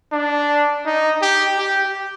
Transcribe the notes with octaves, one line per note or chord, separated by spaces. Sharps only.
D4
D#4
G4
G4